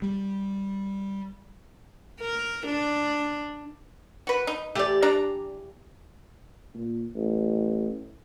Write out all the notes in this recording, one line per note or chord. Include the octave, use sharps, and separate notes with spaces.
G3
A#4
D4
F#4 B4
D#4
E2 A3 G4 D5
D4 D5 A#5
A#2
A1